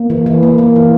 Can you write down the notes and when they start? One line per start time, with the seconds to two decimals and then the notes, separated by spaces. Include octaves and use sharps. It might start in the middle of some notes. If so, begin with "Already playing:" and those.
Already playing: A#3
0.10 E3
0.26 E3
0.43 A#3
0.58 A#3
0.76 E3